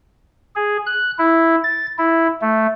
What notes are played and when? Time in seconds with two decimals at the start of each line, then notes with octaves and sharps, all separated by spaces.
0.56 G#4
0.86 F#6
1.19 E4
1.64 A6
1.98 E4
2.41 A3